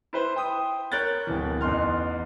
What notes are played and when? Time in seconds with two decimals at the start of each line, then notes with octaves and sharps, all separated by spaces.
0.13 E4 B4 C5
0.36 G5 D#6
0.92 A#4 C#5 F#6 G6 A6
1.27 D1 B2 E3
1.61 A1 E2 D#4 C6 F6